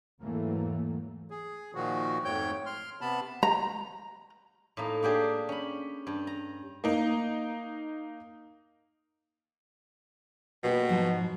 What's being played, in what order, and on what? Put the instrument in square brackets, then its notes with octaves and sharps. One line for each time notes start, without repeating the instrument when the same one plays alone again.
[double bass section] E2 G#2 E3 F#3 A3 A#3
[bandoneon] G#4
A#2 D#3 F3 F#4
F2 G#2 A3 C#5 G5 G6
C6 F6
C3 B3 A5 B5
[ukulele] A#5
[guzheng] A2 A#3 D#4
A#3 D4 G4 G#4
C#4 B5
G2
A#5
[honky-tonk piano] A#3 D#4
[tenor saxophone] B2 [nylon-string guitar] A#3 G4 B4
[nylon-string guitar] G#2 F3 F#3